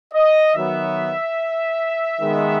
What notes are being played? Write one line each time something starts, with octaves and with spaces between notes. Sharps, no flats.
D#5
D#3 F#3 B3 E5
D#3 G#3 B3